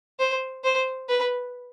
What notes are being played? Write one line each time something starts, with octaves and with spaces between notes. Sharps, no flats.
C5
C5
B4